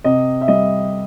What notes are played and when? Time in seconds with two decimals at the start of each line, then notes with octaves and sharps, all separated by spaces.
0.04 C3 D#5
0.41 E5
0.48 G3 D#5